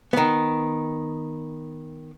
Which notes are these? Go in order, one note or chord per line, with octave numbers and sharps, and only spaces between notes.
D#3 B3